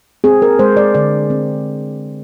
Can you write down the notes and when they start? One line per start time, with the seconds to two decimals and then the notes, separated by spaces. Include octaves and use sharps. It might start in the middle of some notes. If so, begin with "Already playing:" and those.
0.24 C4 G#4
0.42 A#4
0.59 G#3 C5
0.77 D5
0.94 D3 D5
1.30 C4